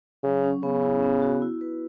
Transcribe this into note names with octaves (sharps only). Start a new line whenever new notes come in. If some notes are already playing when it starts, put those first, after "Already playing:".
C#3 F#3
C#4
C#3 B3
E4
B3
F#4
E4
B4